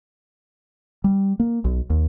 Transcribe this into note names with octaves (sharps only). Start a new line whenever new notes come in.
G3
A#3
B1
D#2